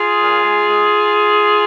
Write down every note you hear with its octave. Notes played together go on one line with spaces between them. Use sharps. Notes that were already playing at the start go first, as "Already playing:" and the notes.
Already playing: F4 G#4
A#2
G#3
G#3